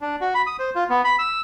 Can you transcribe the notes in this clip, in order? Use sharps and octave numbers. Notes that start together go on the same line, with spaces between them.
D4
F#4
B5
D#6
C5
F4
B3
B5
E6